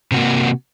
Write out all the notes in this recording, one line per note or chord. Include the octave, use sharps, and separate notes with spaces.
C3 A#3 F#4